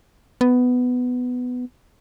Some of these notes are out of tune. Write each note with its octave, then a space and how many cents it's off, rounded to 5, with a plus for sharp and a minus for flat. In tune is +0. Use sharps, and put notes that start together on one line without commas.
B3 +10